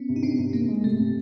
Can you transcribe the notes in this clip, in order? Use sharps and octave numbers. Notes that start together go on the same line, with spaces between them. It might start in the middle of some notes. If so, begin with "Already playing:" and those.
Already playing: B3 C#4
C3
D#4
C3 C4 D4
C3
C3 A#3
G#3
C3 A3
C3